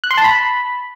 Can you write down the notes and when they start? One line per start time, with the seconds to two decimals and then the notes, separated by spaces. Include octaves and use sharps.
0.04 F#6
0.11 C6
0.17 A5
0.24 B5